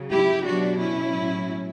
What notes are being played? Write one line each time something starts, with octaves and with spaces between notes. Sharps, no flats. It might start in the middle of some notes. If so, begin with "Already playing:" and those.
Already playing: C#3 F#3
E4 G4
B2 F#3 D4 F#4
C#4 E4
A2 F#3